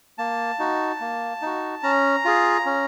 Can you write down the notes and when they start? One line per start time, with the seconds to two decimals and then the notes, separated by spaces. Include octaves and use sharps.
0.18 A#3 A5
0.59 D#4 F#4
1.00 A#3
1.42 D#4 F#4
1.83 C#4 A#5
2.25 F4 G#4
2.66 C#4